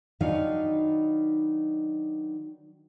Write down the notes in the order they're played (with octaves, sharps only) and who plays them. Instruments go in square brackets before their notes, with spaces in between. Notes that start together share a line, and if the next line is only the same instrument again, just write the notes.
[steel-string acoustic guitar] D#3 F#3 D4 D#4 B4 F5